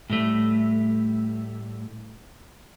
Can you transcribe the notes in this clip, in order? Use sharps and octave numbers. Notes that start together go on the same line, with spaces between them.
A2 G3 A3